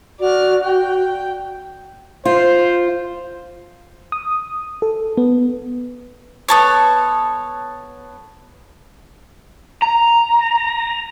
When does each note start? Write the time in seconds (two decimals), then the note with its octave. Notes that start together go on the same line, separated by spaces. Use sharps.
0.20 F#4 D5 F6
0.64 G5
2.25 F4 C5
4.12 D#6
4.82 A4
5.17 B3
6.48 B3 A4 C#5
9.82 A#5